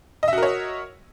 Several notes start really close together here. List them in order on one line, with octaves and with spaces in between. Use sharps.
D#5 E5 F#4 A#4 C#5